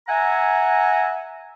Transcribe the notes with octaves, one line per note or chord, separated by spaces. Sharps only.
E5 F#5 G#5 A#5